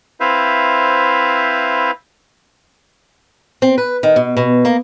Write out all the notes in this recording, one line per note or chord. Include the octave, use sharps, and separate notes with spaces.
C4 E4 B4 C5 E5 F5
C4
B4
D#3
B2
B2
A#3